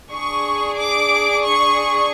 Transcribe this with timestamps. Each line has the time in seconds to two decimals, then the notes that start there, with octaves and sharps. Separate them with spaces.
0.12 D4 G#4 C#6
0.77 D6
1.43 C#6